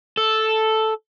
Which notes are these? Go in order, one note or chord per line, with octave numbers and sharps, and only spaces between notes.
A4